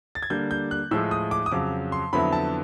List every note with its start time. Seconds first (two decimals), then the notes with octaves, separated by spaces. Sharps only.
0.15 A6
0.22 G#6
0.30 D3 G3 A#3 D4 G6
0.51 G6
0.71 F#6
0.91 A2 F3 G#3 E6
1.11 D#6
1.31 D6
1.46 D#6
1.51 F2 C#3 F#3 D6
1.92 C6
2.13 F2 D3 F#3 B3 E4 B5
2.33 A5